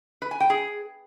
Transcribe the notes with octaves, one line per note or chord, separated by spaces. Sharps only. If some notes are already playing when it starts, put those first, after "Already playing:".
B4
G#5
G5
G#4